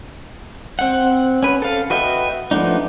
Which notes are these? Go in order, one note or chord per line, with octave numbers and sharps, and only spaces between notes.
C4 F#5
C#4 B4
A4 F5
F#4 B4 D#5 E5 G5
F3 A3 B3 D4 D#4